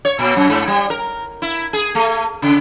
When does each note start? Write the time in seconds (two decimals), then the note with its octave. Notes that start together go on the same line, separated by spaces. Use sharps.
0.05 C#5
0.19 A#2
0.36 F#2
0.50 G#2
0.67 G3
0.90 A#4
1.42 E4
1.73 G#4
1.95 A3
2.42 C#3